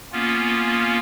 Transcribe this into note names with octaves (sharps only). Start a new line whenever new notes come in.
A#3 B3 C#4 F4